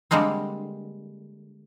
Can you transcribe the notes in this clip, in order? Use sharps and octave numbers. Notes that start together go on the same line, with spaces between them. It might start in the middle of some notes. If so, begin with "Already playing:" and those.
D3 G3 G#3 A#3 C4